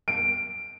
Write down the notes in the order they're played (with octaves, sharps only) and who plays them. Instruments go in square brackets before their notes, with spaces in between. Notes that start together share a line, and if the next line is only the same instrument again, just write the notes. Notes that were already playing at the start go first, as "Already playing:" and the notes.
[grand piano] D7